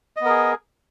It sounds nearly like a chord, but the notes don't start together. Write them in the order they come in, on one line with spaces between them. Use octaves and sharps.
D#5 B3 A#4 G#4